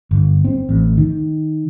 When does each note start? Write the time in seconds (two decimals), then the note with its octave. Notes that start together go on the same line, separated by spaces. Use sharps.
0.11 G1
0.44 C4
0.69 A1
0.97 D#3